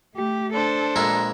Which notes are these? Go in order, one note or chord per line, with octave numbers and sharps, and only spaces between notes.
A3 G4
D4 A4 C5
A#1 G#3 E5 A#5